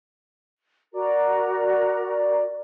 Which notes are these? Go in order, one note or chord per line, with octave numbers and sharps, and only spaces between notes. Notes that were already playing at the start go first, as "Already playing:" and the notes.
F#4 A#4 D5 A#5